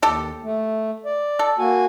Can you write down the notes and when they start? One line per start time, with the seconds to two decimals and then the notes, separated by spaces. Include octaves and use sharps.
0.02 D#2 G4 A4
0.44 A3
1.06 D5
1.39 A4
1.59 A#3 F#4 G#5